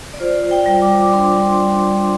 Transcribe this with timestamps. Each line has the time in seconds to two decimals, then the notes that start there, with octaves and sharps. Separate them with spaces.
0.13 D5
0.20 F4 C5
0.51 G5
0.66 G3
0.82 D6
1.13 D4 C6
1.59 G3